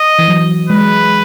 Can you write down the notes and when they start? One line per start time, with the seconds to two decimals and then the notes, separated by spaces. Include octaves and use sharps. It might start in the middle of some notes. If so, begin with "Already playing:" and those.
Already playing: D#5
0.19 E3
0.28 F#3
0.69 G#3 B4